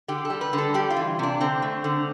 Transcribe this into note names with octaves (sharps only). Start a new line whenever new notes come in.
D3 G4
A4
G3
B4
D3
A4
G3 G4
F4
E3
C3 D4
D3 C4
A3
D3